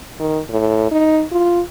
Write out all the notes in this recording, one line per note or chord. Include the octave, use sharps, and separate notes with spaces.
D#3
A2
D#4
F4